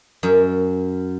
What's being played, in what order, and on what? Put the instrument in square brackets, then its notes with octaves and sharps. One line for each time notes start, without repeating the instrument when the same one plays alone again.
[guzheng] F#2